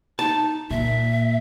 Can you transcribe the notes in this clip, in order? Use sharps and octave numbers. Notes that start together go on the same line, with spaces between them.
D#4 A5
A#2 E5